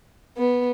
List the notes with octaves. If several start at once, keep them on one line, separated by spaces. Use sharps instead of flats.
B3